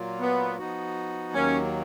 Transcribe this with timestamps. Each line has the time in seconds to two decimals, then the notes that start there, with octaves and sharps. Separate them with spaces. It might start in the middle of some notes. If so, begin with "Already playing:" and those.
Already playing: A#2 F#3 A#3 F4
0.20 B3
0.58 F3 B3 D#4 F#4
1.34 D#2 D#3 F#3 A#3 C#4